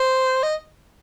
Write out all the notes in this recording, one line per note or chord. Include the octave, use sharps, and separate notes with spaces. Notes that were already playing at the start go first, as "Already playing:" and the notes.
Already playing: C5
D#5